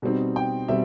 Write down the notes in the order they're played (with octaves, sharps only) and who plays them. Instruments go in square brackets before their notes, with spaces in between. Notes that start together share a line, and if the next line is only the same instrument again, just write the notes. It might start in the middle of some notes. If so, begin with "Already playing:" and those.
[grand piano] B2 G3 C4 D#4
G5
B2 G3 C4 E5